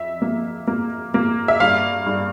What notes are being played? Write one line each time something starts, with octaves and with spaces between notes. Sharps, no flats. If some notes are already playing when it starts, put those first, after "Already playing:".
Already playing: F2 E5
A#3
A#3
A#3
E5
G2 F5
G2